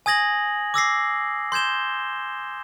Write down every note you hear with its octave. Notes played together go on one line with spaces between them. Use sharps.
G#5 D#6 G#6 A#6 F#7
D6 E6 A#6 C7
C6 G6 G#6 E7 G7